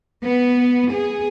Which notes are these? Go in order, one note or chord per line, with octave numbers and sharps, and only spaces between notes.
B3
G#4